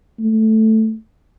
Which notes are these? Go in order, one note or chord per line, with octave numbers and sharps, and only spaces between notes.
A3